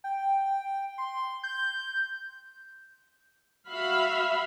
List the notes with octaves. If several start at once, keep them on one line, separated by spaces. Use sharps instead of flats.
G5
C6
G6
F#4 E5 F5 B5